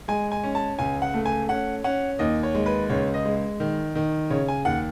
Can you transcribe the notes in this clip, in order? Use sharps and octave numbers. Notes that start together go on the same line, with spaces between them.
G#3 G#5
G#5
C#4
A5
C#2 G#5
F#5
A3
G#5
C#4 F#5
C#4 F#5
D#2 D#5
C#5
G#3
B4
C#2 C#5
D#5
G#3
D#3
D#3
C#3 C#5
G#5
D#2 F#5